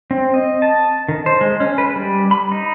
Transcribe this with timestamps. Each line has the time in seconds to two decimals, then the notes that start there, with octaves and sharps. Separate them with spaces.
0.11 C4
0.34 D#5
0.62 A5
1.09 D#3
1.26 C5
1.41 G#3
1.60 C#4
1.78 B4
1.96 G3
2.31 B5
2.52 D#4